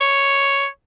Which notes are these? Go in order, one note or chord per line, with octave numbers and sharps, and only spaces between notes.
C#5